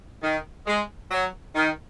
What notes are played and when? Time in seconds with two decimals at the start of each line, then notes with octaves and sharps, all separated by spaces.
0.23 D#3
0.67 G#3
1.11 F#3
1.55 D#3